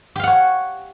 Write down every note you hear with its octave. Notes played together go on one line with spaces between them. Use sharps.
G4 C#5 F5 F#5